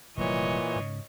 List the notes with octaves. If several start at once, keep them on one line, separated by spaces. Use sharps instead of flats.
F1 A#2 E3 F#3 G3 C#5 D#5
G#2 C#3